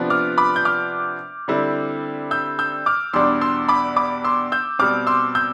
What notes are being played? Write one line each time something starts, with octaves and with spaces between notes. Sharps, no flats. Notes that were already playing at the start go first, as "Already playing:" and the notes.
Already playing: C3 F3 B3 D4
D6 F6
B5 D6
G6
D6 F6
D3 G3 C4 E4
E6 G6
E6 G6
D6 F6
E2 B2 G3 D4 C6 E6
C6 E6
B5 D6
B5 D6
C6 E6
E6 G6
B2 G3 C4 D6 F6
C6 E6
E6 G6